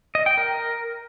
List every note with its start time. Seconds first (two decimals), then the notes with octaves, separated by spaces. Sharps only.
0.15 D#5
0.26 G5
0.37 A#4